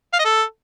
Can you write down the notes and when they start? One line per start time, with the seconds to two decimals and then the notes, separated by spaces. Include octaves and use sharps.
0.13 F5
0.19 D#5
0.25 A4